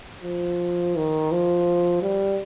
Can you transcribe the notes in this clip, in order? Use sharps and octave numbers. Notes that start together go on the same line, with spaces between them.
F3
D#3
F3
G3